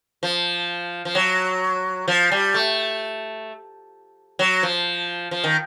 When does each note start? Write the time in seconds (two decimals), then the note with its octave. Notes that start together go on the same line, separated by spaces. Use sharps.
0.23 F3
1.05 F3
1.15 F#3
2.08 F3
2.32 G3
2.54 A3
4.39 F#3
4.63 F3
5.31 F3
5.44 D#3